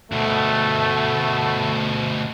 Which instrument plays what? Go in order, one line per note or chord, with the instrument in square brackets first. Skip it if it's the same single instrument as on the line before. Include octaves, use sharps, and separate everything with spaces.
[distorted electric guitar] D2 B2 [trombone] A3